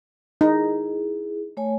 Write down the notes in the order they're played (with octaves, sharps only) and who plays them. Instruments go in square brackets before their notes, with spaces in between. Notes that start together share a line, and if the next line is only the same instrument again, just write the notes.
[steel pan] D#4 [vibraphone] E4 G#4
[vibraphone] A3 C#5 G#5